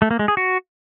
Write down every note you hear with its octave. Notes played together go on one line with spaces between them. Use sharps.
A3
A#3
G#3
G#4
F#4